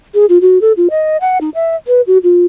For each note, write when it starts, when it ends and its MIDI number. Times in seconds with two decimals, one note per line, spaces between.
0.14 0.26 68
0.29 0.38 65
0.41 0.61 66
0.61 0.73 69
0.77 0.88 65
0.90 1.17 75
1.21 1.38 78
1.41 1.50 63
1.55 1.76 76
1.88 2.01 71
2.07 2.18 66
2.23 2.46 65